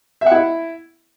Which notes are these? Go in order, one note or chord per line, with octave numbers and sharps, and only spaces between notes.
E5
F#5
E4